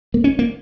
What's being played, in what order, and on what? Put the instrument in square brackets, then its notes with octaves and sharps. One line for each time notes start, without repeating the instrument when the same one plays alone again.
[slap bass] A#3
C#4
A#3